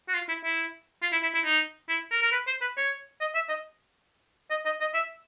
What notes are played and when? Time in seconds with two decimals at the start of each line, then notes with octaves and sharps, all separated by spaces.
0.08 F#4
0.14 F4
0.28 E4
0.44 E4
1.02 F4
1.12 E4
1.23 E4
1.34 E4
1.45 D#4
1.89 E4
2.11 A#4
2.22 A#4
2.32 B4
2.47 C5
2.61 B4
2.77 C#5
3.21 D#5
3.35 E5
3.49 D#5
4.50 D#5
4.65 D#5
4.80 D#5
4.94 E5